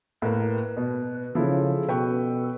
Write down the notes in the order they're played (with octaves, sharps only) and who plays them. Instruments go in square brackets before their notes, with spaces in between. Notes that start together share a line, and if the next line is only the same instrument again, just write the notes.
[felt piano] A2 A#3 [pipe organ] B4
[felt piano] B2
[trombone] C#3 [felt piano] F3 E4 [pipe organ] A4
[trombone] B2 [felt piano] B4 G5 C#6